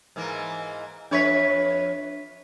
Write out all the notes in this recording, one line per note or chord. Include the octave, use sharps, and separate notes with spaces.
G#2 E3 A#3
F2 D4 B4 C#5 E5 B6